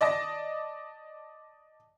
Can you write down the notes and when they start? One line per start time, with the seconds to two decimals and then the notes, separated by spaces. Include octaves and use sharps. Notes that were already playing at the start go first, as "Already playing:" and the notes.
0.01 D5 D#5 A5 A#6